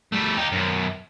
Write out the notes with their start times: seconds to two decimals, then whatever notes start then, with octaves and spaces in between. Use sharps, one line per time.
0.12 G3 A3
0.37 D#4 G4
0.52 F#2 B2